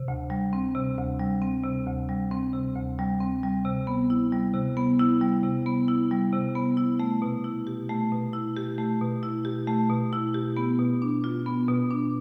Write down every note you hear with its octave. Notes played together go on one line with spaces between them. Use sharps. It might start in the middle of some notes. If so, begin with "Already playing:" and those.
Already playing: C3
D2
G3
C4
C3
D2
G3
C4
C3
D2
G3
C4
C3
D2
G3
C4
G3
C3
B3
E4
G3
C3
B3
E4
G3
C3
B3
E4
G3
C3
B3
E4
A3
B2
E4
G4
A3
B2
E4
G4
A3
B2
E4
G4
A3
B2
E4
G4
B3
B2
D4
F4
B3
B2
D4